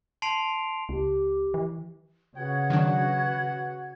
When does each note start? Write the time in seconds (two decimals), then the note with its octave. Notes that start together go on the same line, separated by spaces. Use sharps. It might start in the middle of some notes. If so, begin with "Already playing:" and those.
0.22 A5 C6 C7 D7 F7
0.89 C#2 G4
1.54 E3
2.37 C#3 F#4 B4 F#5 G#6
2.70 D#3 F#3 D4